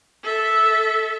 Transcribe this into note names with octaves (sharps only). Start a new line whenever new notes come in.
A4 E5